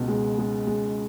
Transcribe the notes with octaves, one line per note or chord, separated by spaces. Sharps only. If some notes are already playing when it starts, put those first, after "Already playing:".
Already playing: C#2 B2
G#3
G#3
G#3